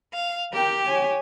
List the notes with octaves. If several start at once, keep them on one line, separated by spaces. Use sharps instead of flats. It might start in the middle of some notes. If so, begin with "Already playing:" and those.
F5
G4 A#4 G5
C#5 G#5